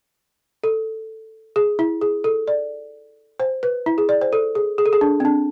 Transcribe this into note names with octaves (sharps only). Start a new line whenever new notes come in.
A4
G#4
E4
G#4
A4
D5
C5
B4
E4
G#4
D5
C5
A4
G#4
G#4
A4
G#4
D4
C4
D4